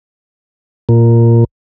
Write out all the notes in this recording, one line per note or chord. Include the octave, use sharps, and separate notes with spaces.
A#2